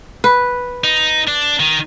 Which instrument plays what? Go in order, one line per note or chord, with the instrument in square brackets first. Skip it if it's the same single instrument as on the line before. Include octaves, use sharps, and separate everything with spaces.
[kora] B4
[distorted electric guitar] D#4
D4
D#3